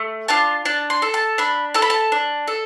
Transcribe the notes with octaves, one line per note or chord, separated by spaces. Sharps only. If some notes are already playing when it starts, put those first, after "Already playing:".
Already playing: A3
D4 F4 A5
D4 A5
C6
A4
A5
D4 B5
A4 A5
B5
A5
D4
A4